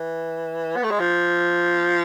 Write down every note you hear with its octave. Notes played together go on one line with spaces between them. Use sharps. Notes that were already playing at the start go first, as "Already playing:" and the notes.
Already playing: E3
B3
A3
G#3
F3